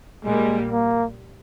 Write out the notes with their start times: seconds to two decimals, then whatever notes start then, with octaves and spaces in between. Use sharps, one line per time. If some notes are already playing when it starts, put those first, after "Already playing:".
0.25 A#1 A#2 G3 G#3 A#3
0.72 A#3